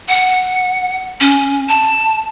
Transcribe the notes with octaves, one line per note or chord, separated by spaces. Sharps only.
F#5
C#4
A5